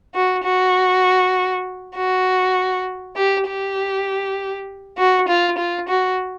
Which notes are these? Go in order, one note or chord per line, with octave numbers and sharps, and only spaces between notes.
F#4
F#4
F#4
G4
G4
F#4
F4
F4
F#4